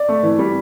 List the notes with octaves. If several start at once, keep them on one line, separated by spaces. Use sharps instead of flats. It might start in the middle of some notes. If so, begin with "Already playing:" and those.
Already playing: D5
A3
E3
G3